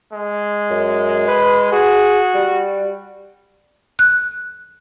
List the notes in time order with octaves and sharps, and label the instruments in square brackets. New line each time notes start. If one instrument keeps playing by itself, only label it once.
[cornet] G#3
[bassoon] F#2
B4
[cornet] F#4 [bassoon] G#4
[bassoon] G3
[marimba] F#6